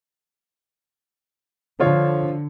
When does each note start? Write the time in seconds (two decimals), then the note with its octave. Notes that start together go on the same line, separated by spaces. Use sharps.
1.80 D3 F3 F4 C#5